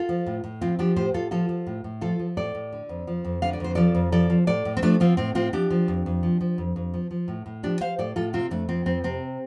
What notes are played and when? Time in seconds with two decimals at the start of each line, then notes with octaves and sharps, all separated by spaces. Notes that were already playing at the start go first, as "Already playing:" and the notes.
Already playing: F4 A4
0.09 F3
0.26 A2
0.44 A2
0.61 F3 C4 F4
0.79 F3 D4 G4
0.96 A2 G4 C5
1.14 A2 F4 A4
1.31 F3 F4 A4
1.49 F3
1.67 A2
1.84 A2
2.01 F3 F4 A4
2.19 F3
2.37 A2 A4 D5
2.55 A2
2.72 D3
2.89 F2
3.07 F3
3.24 F2
3.42 D3 F5
3.53 D5
3.60 F2 C5
3.75 F3 A4 D5
3.95 F2
4.12 F3 A4 D5
4.30 F3
4.47 A2 A4 D5
4.65 A2
4.77 C4
4.82 F3 A3 D4
5.00 F3 C4 F4
5.17 A2 C4
5.35 A2 C4 F4
5.53 F3 D4 G4
5.70 F3
5.88 F2
6.06 F2
6.23 F3
6.41 F3
6.58 F2
6.76 F2
6.94 F3
7.11 F3
7.28 A2
7.46 A2
7.63 F3 D4 G4
7.81 F3 C5 F5
7.98 A2 A4 D5
8.16 A2 F4 A4
8.33 C3 C4 F4
8.51 F2 A3 D4
8.69 F3 C4
8.86 F2 C4
9.04 C3 C4